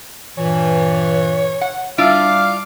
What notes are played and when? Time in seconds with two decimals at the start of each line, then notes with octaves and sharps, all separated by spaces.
0.37 G2 A#2 E3 C#5
1.61 F#5
1.98 G3 D4 E4 F4 F5 D6